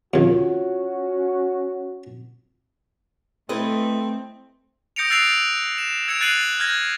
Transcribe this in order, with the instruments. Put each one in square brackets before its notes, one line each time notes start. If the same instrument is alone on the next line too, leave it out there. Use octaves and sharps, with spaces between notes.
[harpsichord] D#2 C#3 [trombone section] C#4 F#4 [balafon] F4
[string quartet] A3 [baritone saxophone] C4 [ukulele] E4 A4 [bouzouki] B4 D#5
[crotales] D#6 G6 A#6 C#7 D7 F7
E6 F#6 A6 C7 D7 F7
E7
E6 G#6 C#7 D7 F7
F#6 A6 C7 C#7 D#7 F#7
F6 G6 G#6 A#6